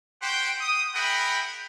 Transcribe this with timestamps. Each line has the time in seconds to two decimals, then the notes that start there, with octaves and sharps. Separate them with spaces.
0.22 F#4 G4 C5 F#5 G5
0.61 D#6
0.95 E4 G#4 A#4 F#5 G5 B5